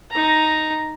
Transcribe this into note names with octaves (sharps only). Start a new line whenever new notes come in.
D#4 A#5